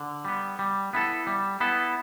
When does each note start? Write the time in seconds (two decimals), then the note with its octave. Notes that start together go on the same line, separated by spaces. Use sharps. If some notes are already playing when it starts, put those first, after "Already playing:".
Already playing: D3
0.25 G3 B3
0.59 G3
0.93 B3 E4 A4
1.27 G3
1.60 B3 E4 A4